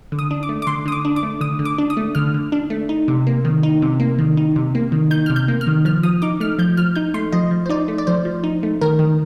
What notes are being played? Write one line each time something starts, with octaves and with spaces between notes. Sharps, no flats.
D3
D#6
D4
D6
A3
D6
D3 C6
D3 D#6
D6
D4
D6
A3
D3 D#6
D3
D6
D4
D#6
A3
D3 F6
D3
D4
A3
D#4
C3
A#3
D#3
D#4
C3
A#3
D#3
D#4
C3
A#3
D#3
D#4 G6
C3 F6
G6
A#3
F6
D#3
F3 F6
F3 D#6
D#4 D6
A3 F6
F3 G6
F3 F6
D#4 G6
A3 C6
F3 D#5
F3
C5
D#4 D5
A3
D5
F3 C5
F3
D#4
A3
D#3 A#4
D#3